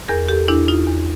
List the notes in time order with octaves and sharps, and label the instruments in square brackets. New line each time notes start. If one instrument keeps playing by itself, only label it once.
[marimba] E2 G#4 A#4
G4 A4
E2 D4 E4
D#4 F4
E2